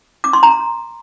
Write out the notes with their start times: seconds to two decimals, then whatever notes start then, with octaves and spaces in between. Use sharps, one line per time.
0.24 D6
0.33 C6
0.43 A#5